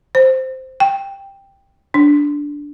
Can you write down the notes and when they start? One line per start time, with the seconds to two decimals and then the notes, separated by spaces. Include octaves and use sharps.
0.15 C5
0.80 G5
1.94 D4